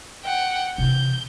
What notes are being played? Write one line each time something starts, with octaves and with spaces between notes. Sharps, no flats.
F#5 G5
C3 E3 G6